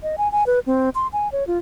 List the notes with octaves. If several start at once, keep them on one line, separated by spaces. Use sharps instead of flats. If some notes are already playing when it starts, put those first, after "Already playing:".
D#5
G#5
G#5
B4
C4
C6
G#5
C#5
F4